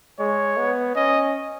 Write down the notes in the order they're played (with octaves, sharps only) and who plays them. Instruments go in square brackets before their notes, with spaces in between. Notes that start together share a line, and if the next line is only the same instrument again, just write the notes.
[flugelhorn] G#3 [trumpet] C#5
[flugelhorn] B3
[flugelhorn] C#4 [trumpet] D#5